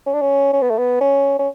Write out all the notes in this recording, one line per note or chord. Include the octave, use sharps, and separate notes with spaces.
C#4
D4
C#4
C#4
B3
A3
B3
C#4
C#4